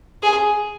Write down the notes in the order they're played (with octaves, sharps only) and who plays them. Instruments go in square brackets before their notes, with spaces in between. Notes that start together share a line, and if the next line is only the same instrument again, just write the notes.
[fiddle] G#4